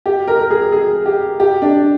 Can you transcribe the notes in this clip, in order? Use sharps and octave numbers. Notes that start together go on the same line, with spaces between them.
G4
A#4
A#4
G#4
G#4
G4
G4
D4